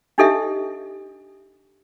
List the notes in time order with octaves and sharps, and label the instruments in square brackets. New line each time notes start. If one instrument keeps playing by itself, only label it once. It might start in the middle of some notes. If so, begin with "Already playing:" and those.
[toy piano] D4 D#4 G4 A4 D#5 E5